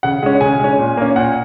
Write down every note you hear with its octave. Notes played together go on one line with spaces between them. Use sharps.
C#3 F#5
G#3 C#4
C#3 G#5
G#3 C#4
A#2
A#3 C#4
A#2 F#5